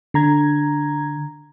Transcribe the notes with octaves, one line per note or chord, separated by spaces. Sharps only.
D3 A#5 G#6